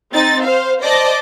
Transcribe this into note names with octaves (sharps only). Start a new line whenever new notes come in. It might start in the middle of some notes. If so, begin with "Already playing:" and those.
C4 D#4 A6
C5 F5
C5 D5 D#5 A5 D6